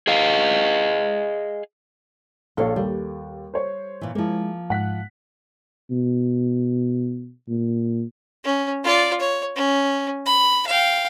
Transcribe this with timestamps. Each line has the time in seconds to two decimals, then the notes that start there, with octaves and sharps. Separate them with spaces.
0.07 G#4 D#5 F5
2.57 A#1 A4 A#4 C#5 F5
2.76 D#2 G3
3.54 C5 C#5
4.01 A#2 E3
4.15 F3 G#3 A#3 E4
4.70 G#2 F#5 F#6 B6
5.91 B2
7.49 A#2
8.44 C#4
8.84 F4 D5
9.20 C#5
9.56 C#4
10.26 B5
10.67 F5 G5